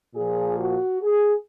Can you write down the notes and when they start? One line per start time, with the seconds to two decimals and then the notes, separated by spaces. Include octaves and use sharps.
0.15 A#2 F3 G#4
0.59 F#4
1.02 G#4